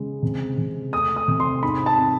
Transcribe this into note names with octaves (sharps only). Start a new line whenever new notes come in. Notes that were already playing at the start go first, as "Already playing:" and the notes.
Already playing: C#3 G#3
C3
C3
A3 D#6
D#6
C3
C6
G#2 B5
A5
C4